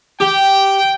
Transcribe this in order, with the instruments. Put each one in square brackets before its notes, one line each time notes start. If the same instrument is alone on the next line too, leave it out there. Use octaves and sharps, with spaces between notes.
[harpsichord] G4 [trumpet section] G5